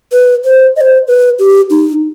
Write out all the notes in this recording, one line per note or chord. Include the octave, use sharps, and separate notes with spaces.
B4
C5
D#5
C5
B4
G4
D#4